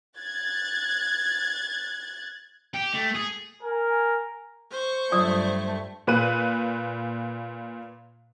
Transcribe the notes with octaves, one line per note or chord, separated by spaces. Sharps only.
F#6 G#6 A6
G4
A3
G#4
A#4 G#5
C5 C#6
G2 F#3 A3 F4 D5 D#6 E6
A#2 B4 F#6 D#7